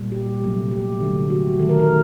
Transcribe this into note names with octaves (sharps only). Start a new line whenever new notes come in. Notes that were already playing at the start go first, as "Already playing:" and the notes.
Already playing: A#2 G3 A#3
G4
C3 F#3 A3
G4
D3 F#3 A3
F#4
D#3 A3 A4
A#4
A#4